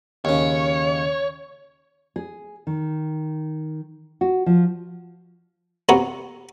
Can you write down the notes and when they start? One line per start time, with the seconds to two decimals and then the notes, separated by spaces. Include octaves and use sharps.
0.25 D#2 C#3 C#5
2.16 G#4
2.67 D#3
4.21 F#4
4.46 F3
5.89 C3 B3 F#4 C#5 A#5